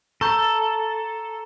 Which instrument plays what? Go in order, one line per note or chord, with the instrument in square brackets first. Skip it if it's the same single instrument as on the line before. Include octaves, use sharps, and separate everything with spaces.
[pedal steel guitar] A4 [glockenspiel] A#5 C#6 G6